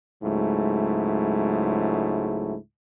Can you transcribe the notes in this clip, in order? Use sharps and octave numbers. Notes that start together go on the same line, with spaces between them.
C#2 G#2 F#3 A3 E4